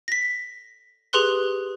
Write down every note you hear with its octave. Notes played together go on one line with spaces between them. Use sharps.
A#6 B6
G4 G#4 B4 C6 F#6 G7